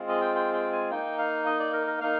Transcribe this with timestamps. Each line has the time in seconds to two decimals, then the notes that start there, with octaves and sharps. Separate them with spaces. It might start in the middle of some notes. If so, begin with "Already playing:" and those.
Already playing: G#3 C4 F4
0.09 D#5
0.21 G5
0.36 G5
0.54 G5
0.73 G#5
0.91 A#3 D#4 G5
1.18 F5
1.46 D#5
1.60 D5
1.73 A#4
1.87 A#4
2.01 A#3 D#4 F5